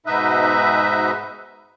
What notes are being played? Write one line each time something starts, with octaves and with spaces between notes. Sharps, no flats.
G#2 B2 D#4 B4 D#5 E5